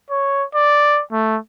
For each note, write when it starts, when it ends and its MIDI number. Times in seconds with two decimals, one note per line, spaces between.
0.10 0.44 73
0.55 1.01 74
1.12 1.37 57